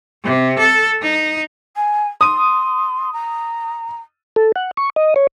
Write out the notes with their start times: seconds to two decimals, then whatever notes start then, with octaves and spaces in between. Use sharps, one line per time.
0.24 C3
0.59 A4
1.02 D#4
1.76 G#5
2.21 C6 D#6 D#7
3.12 A#5
4.36 A4
4.56 F#5
4.77 C#6
4.96 D#5
5.16 C#5